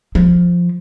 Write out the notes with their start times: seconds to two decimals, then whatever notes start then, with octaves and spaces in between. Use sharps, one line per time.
0.15 F3